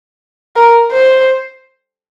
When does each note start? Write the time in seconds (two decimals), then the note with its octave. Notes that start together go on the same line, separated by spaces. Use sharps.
0.56 A#4
0.92 C5